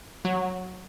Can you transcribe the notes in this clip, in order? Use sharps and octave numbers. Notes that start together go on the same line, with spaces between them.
F#3